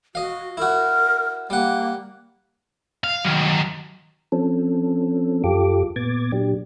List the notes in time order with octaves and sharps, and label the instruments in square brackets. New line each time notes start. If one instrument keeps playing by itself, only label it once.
[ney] F#4 [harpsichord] D#5 F5
[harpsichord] E4 F#4 [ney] A#4
[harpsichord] G3 F#5 [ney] A#3
[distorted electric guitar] F5
D#3 F#3
[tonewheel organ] F3 C4 C#4 A4
F#2 F4 G4 A4 D6
A#2 B3 D6 G#6 A6
A#2 F#3 D4 G4